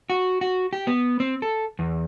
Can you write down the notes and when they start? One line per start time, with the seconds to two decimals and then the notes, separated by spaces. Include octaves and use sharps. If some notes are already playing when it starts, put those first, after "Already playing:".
0.10 F#4
0.41 F#4
0.73 G4
0.87 B3
1.20 C4
1.42 A4
1.79 E2